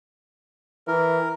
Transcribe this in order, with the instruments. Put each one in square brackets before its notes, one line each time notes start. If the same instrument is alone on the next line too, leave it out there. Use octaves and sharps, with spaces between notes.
[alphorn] E3 [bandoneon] A#4